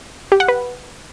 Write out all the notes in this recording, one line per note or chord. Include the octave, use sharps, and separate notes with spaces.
G4
F#5
B4